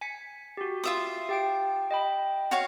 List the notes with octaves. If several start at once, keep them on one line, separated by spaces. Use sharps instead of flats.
G#5 B6 C#7
F#4 G4
F4 E5 D#6
G4 G5 D7
D#5 G5 B5
F#4 C#5 F5